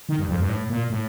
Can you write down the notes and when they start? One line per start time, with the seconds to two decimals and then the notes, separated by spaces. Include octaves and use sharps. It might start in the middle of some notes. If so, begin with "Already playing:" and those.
0.09 D#3
0.19 G2
0.29 F2
0.39 G2
0.49 A2
0.70 A#2
0.90 A2